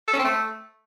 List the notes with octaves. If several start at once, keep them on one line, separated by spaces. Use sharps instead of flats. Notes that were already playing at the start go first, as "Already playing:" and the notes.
A4
C#4
C4
A3